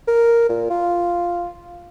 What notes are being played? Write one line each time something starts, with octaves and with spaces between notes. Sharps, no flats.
A#4
A#2
F4